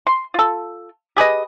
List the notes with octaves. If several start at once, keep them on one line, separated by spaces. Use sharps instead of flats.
C6
F4 A4
G4 G#4 B4 D#5